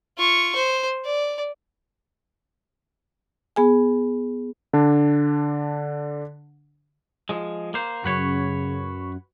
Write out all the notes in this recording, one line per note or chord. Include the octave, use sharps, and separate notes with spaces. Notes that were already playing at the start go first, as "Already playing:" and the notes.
F4 C#6
C5
D5
B3 G#4 G#5
D3 D4
F3 G#3
A#3 C5
F#2 C#3 F#4 B4 C#5